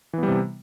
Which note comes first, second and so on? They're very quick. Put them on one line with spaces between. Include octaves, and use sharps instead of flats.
E3 B3 G3 C3